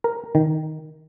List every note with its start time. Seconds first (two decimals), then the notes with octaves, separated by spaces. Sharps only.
0.04 A#4
0.35 D#3